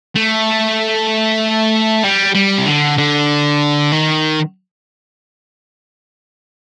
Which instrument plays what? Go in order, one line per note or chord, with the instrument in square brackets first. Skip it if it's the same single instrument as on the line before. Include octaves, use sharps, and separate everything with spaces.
[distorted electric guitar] A3
G3
G3
C3
D3
D3
D#3